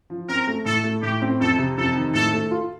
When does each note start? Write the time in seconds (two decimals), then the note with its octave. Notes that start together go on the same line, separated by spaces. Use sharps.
0.10 F3
0.29 C4 A#4
0.47 A3
0.65 A2 A4
0.84 A3
1.03 A2 G4
1.22 C4
1.40 F2 A4
1.58 C3
1.77 F2 A4
1.95 D#3
2.14 A2 A4
2.33 A3
2.51 F4